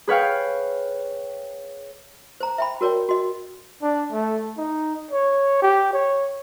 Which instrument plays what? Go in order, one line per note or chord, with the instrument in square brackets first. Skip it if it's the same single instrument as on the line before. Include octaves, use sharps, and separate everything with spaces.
[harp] G#4 B4 C#5 F5 G5
[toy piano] C5 A#5
E5 G5 B5
F#4 A#4 C#5 D5 G5
F#4 D#5
[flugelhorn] D4
A3
D#4
C#5
G4
C#5